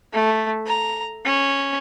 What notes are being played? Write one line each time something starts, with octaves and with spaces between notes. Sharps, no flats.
A3
A#5
C#4